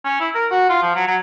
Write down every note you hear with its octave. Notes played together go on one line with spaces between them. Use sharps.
C#4
E4
A#4
F#4
F4
F3
F#3
F#3